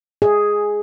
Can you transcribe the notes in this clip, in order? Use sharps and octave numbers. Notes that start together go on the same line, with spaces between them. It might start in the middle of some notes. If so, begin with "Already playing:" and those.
G#4